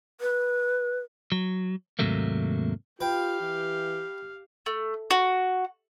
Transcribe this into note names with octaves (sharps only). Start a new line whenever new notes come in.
B4
F#3
D#2 G#2 C3 F#3 A3 A#3
F4 G4 B4 F5 G5
E3
A3
F#4